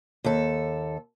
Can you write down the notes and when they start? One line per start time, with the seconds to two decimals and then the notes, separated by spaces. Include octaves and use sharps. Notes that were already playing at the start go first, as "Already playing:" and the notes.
0.24 D#2 A4